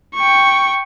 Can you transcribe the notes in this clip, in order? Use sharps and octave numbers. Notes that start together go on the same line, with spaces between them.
G5 C#6